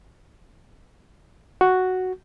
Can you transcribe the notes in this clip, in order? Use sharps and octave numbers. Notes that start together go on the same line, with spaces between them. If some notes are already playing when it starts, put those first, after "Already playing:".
F#4